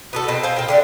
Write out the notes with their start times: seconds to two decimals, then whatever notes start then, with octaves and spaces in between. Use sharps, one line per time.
0.13 B3 F#4 A4
0.28 B2 C4 A5
0.43 C5 F5 G#5
0.56 A#2 G5
0.68 D3 D4 G4